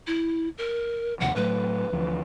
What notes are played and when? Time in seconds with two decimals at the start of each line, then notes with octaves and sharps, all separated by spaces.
0.07 E4
0.58 A#4
1.20 D#2 C3 F3 F#5
1.36 A2 F#3 A3 B4
1.92 D2 E3 F3